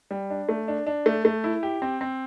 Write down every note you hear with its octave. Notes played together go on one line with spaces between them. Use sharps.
G3
D4
A3
D4
D4
A3
A3
E4
G4
C4
C4